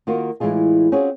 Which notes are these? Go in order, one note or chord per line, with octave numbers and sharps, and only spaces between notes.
D#3 A#3 F4 F#4
A2 E3 G#3 E4 F4 G#4
C4 C#4 F4 F#4 G#4